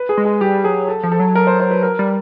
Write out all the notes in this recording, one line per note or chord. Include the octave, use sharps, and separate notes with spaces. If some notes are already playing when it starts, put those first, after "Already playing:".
Already playing: B4
G#4
G#3
G#4
G3 G4
F#3 G#4
A4
F3
A4
F#3
A#4
C5
C5
B4
A#4
G3